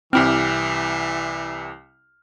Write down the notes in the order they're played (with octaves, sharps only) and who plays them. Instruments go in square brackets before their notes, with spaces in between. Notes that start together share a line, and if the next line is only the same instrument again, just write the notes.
[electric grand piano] C2 G4 F6 [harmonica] E3 [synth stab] C4 E4